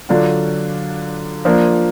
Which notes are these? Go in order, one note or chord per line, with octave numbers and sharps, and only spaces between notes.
D3 F#3 D4 F4
F3 A#3 D4